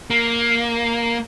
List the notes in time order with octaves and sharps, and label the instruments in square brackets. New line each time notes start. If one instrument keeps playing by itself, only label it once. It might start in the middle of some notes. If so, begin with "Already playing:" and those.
[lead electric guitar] A#3